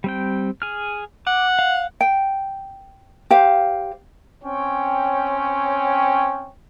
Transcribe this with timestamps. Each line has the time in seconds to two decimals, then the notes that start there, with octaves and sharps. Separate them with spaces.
0.04 G3 C4 G5
0.62 G#4 F6
1.27 F#5 D6
1.59 F5
2.01 G5
3.31 G4 C5 F5
4.44 C4 C#4 C#5 G5